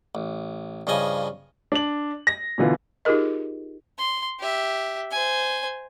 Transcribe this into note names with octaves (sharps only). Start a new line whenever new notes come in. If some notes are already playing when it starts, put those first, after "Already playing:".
A1
G2 C#3 F3 D#5 G#5
D4 F#7
A#6
B2 D3 E3 F4
D#4 F4 G4 G#4 A#4 D#5
C6
G4 E5
C5 G#5